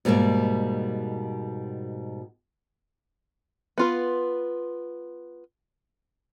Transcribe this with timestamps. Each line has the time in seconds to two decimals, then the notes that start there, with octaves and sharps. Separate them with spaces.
0.05 G#2 B2 G3 A3 A#3
3.78 B3 F4 B4